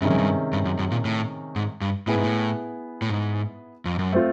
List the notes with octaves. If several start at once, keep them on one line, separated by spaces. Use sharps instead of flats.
G2 C3 D#3 G#3 C#4
F#2
G2
G2
F#2
F#2
A#2
A2
G#2
G2
A2 B3 E4 G#4 B4
G#2
A2
A2
G#2
F2
F#2
A3 C4 F4